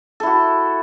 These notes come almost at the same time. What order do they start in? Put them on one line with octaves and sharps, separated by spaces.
A4 E4 F#4